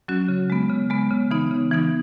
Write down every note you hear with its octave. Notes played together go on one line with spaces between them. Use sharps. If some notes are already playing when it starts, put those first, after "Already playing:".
F#3 C#4 F#4
C#3
G#3 B3
C#3
G#3 B3
C#3
E3 B3 D#4
C#3
E3 B3 D#4